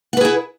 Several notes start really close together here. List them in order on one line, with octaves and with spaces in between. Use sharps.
F#5 B4 G#4 E4